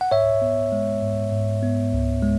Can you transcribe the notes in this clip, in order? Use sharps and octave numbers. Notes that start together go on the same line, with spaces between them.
F#5
G#2 C#5 E5
B3
G#3
G#2
G#2
B3
C#2
G#3